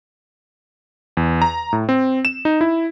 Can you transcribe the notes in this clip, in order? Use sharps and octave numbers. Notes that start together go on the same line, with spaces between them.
E2
A#5
A2
C4
E7
D#4
E4